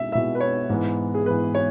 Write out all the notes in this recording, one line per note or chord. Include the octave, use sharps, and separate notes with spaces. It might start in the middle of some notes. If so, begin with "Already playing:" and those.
Already playing: B2 G#3 E4 E5
B2 G#3 E4 E5
B4
C#5
G#2 E3 B3
G#4
G#2 E3 B3 B4
C#5